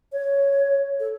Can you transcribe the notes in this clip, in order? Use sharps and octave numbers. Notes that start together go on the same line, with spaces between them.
C#5
A4